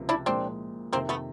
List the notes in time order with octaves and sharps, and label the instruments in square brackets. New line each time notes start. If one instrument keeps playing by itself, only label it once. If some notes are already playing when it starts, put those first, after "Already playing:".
Already playing: [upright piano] C#2 C3 F3 A#3
[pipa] D4 E4
[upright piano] A#2 F3 G#3 [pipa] C4 D4
[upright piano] F2 C3 D#3 [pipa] A#3 C4
[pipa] A3 B3